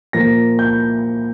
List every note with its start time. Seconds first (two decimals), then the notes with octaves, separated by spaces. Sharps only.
0.13 A#2 F3 A#3 A#6
0.59 G6